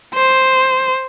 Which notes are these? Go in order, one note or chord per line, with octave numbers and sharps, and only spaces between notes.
C5